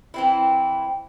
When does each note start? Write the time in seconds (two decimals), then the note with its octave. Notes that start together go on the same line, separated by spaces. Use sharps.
0.14 E3 C4 E4